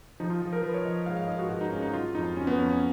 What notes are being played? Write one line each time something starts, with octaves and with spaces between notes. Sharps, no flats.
F3 D#4
F4
F3
A#4
F3 B4
C#5
F3 D#5
G#2 F5
F5
G#2 D#5
F#4
G#2 F#4
D#4
G#2 C#4
D#4
F#3 F4
F2 D#4
F#3 C#4
B3
F2 C#4
C#4